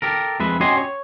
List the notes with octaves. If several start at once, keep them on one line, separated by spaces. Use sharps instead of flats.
G4 A4 A#4
F2 G#3 B4 E5
C#4 F#4 G4 D#5 G#5 C6
C#5